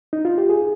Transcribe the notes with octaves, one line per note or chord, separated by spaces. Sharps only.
D#4
F4
G4
G#4